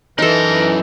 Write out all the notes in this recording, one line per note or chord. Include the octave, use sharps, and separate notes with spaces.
F#2 E3 D#4 A4 A#4 C6